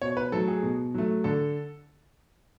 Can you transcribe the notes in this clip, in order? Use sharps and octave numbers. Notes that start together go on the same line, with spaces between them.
B2 C#5
B4
F#3 A3 A4
G#4
B2
F#3 A3
D3 A4